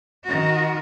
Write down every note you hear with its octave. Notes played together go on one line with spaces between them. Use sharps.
D#3 F#4